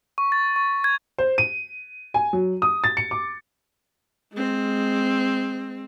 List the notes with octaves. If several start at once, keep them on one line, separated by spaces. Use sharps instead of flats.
C#6
A6
C#6
G#6
C5
D#7
G#5
F#3
D#6
A6
C#7
D6
G#3 C4